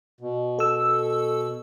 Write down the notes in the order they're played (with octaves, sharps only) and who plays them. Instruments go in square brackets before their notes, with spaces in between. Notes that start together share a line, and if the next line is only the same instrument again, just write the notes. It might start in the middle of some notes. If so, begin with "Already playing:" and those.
[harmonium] B2
[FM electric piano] A4 E6